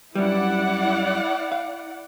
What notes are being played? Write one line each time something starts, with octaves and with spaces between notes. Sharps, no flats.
F#2 G3 E4 D5 F#5
F5